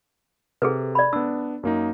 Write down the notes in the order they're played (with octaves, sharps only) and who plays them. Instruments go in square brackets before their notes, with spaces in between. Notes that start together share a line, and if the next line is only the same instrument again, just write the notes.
[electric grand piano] C3 [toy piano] G#4 A4 B4
[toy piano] D5 B5
[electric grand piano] B3 D4 [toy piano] E6
[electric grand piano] F#2 A#3 D#4